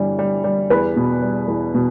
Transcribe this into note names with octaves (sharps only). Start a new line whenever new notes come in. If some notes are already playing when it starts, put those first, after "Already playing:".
Already playing: G1 E3 G3
G3
G3
E2 B4
B2
G3
E2
B2